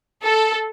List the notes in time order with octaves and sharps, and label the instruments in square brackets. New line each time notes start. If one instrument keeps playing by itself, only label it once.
[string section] A4